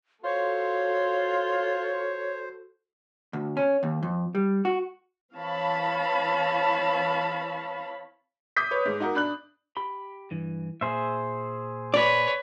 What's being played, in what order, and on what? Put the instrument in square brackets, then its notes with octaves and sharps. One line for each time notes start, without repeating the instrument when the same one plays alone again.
[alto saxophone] F4 [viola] F#4 A4 [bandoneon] C5 [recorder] C#5
[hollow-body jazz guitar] D2
C#4
D#2
F2
G3
F#4
[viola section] E3 C4 C#5 F5 A5 B5
[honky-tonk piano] D6 D#6 G6 B6
B4 C#5
G#2
D#4 F#4 A#4
D4 B5 F#6 F#7
[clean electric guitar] G4 B5
G2 E3
[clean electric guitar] A#2 [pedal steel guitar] G#4 C5 E5
[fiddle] B4 C#5 [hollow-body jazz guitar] D5